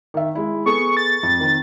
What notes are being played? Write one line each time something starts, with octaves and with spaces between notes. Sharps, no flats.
D#3 E5
G#3 E4
B3 G#4 A4 C#6
A6
F2
D#3 C4